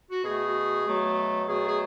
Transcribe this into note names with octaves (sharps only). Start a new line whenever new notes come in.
F#4
B2 A3 G#4
B2 F#3 A3
B2 F#3 A3 G#4
G#4